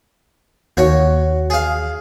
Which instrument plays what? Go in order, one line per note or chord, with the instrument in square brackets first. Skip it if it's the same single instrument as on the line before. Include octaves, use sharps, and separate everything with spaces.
[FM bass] D#2 [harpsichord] F#4 C#5
[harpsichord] G#4 F5